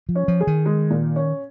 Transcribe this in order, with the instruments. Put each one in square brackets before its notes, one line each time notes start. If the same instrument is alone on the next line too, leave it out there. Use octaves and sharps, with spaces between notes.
[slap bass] F3
[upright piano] C#4
[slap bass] F3
[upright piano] G#4
[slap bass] D#3
[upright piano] G#3
A#2
C#4